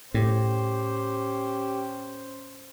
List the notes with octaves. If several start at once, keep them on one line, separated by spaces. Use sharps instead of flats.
A2 C#4 G4 C5